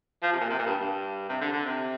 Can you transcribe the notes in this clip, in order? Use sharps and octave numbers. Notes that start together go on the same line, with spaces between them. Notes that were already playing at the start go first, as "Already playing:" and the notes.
F3
C3
A#2
C3
A#2
G2
G2
C3
D3
D3
C3